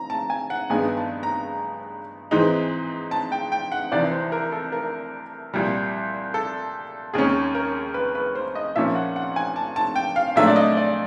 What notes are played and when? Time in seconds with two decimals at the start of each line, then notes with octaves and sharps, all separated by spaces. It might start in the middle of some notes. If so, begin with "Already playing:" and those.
Already playing: A#5
0.10 A5
0.30 G#5
0.50 F#5
0.70 G2 D#3 G#3 B3 D#4 G#5
0.97 A5
1.23 A#5
2.31 G#2 E3 G#3 C4 D#4
3.11 A5
3.32 G5
3.52 G5
3.72 F#5
3.92 C2 C3 E3 D5
4.12 C5
4.32 A#4
4.52 A4
4.72 A#4
5.54 C2 A#2 G3
6.34 A4
7.14 D#2 D#3 G#3 C#4 G#4
7.55 A#4
7.94 B4
8.15 B4
8.35 C5
8.55 D#5
8.76 A#2 F3 A#3 C#4 E5
8.95 F#5
9.16 F#5
9.36 G#5
9.56 A5
9.76 A5
9.96 G5
10.16 F5
10.36 A#2 F#3 A3 D4 E5
10.47 D5
10.56 D#5
10.77 D5